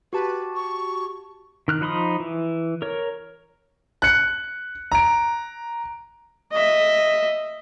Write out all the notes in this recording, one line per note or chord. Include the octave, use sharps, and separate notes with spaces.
F#4 G4 B4 A5
C#6
D#3 F6 F#6
F3 D#4 B5 C6 D#6
E3
A#4 C#5
F#6 C#7
A#5 D7
D#5 E5